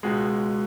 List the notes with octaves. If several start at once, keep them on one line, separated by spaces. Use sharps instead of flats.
C#2 B2 G#3